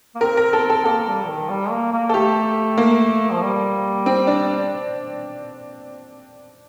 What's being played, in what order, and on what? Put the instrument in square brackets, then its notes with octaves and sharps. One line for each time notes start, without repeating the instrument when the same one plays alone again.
[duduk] A#3
[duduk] C4 [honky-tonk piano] A#4
[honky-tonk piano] A#4
A4
A4
[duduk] A#3 [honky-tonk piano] A4
[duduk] G3
D#3
G3
A#3
A#3
[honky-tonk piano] A4
[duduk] A3 [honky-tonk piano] G4
[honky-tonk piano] A#3
[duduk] F3
G3
[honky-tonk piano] C4
D4